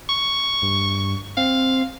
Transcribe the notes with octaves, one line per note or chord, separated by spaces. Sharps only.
C#6
G2
C4 F5